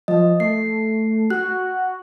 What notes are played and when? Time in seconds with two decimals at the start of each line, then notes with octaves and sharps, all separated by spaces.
0.08 F3 D#5
0.40 A3 C7
1.30 F#4 F#6